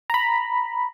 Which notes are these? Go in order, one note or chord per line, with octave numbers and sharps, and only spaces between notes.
A#5 B5